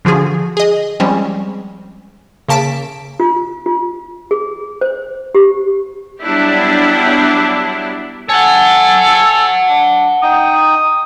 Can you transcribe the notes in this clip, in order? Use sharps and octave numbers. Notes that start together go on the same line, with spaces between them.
D3 F3 F#4 G#4
G#4 D#5
F3 G3 G#3 C4 C#4
C#3 A#3 A5 B6 D7
F4
F4
G#4
C5
G4
F#3 G3 B3 D4 E4 G4
A4 C#5 F#5 G#5 A5
D4
D#4 G5 D#6